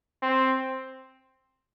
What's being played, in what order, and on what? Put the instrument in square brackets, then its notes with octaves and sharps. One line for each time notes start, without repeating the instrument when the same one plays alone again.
[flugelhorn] C4